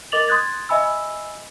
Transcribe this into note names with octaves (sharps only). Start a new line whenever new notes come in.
A#4 D#5 D6 A6 F7 F#7
C6 D#6 F#6 G#6 A6
D#5 E5 G#5 B5 E6